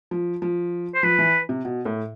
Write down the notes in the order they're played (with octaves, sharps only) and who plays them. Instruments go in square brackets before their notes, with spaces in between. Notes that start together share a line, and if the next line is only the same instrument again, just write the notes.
[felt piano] F3
F3
[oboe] C5
[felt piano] F3 [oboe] B4
[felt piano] E3
C3
B2
A2